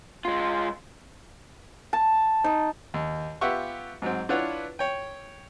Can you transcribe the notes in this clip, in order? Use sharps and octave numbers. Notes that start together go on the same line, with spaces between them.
G#3 F4
A5
D#4
D#2
B3 F4 G4 E5 F#5 C#6
G#2 F#3 C4
D4 E4 F4 B4 C#5 F#5
C#5 G5